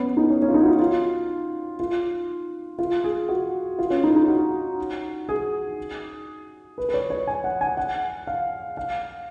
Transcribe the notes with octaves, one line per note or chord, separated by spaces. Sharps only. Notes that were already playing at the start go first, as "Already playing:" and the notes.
Already playing: B3 C#4
D#4
C#4
C#4
F4
D#4
F#4
F4
F4
F4
F4
G#4
F#4
F4
C#4
D#4
D#4
F#4
G#4
B4
B4
C#5
C#5
G#5
F#5
G#5
F#5
F5
F5